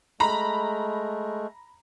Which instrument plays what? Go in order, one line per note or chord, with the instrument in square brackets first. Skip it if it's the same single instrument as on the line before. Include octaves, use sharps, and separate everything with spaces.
[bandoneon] G#3 A3 [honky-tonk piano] A#5 B5